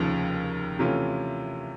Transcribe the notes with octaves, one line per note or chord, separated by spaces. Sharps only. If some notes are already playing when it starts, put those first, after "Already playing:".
Already playing: F1 D#2 C#3 F3
C3 E3 A3 C#4 F4